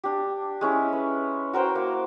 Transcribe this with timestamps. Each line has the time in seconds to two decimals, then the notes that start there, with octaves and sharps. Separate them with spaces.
0.04 D4 G4
0.61 G#3 C#4 E4
0.93 B4
1.53 F#4 A#4 C5 G5
1.75 A#3